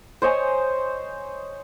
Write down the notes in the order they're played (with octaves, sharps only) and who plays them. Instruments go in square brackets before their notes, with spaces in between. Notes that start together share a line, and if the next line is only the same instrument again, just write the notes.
[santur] C5 C#5 D#5 G#5